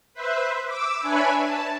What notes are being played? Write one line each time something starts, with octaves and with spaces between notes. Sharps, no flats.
B4 C5 E5
D6 E6
D4 B4 C#5 E5 G#5 B5
A5